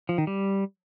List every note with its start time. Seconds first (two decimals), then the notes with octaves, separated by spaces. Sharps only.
0.09 F3
0.18 D#3
0.27 G3